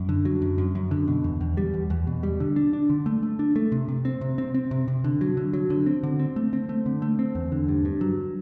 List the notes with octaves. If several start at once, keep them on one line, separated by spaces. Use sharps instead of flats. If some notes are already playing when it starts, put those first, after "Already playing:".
Already playing: F#2
D3
F#3
F#2
F#2
F#2
D3
B2
E2
E2
G3
E2
E2
B2
G3
D3
D4
D4
D3
A3
A3
D4
A3
C3
C3
C4
C3
C4
C4
C3
C3
D3
F#3
D3
F#3
D3
C4
D3
C4
A3
C4
A3
D3
A3
C4
E2
D3
G2
G2
F#3